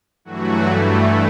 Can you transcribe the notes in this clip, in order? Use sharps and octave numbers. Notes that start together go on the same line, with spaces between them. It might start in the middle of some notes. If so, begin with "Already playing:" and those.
G2 E3 F#3 A3 F#4
E3 E4